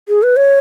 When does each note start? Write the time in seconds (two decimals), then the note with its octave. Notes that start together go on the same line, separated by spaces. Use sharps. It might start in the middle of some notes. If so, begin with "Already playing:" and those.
0.08 G#4
0.23 B4
0.37 C#5